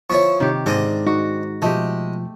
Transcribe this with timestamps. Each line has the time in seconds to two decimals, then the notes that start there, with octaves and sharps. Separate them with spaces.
0.10 F3 E4 C#5 C#6
0.40 C3 D#3 G4
0.66 G#2 C4 D4 D#5
1.07 D#4 F#4
1.62 B2 F3 G#3 A3 G4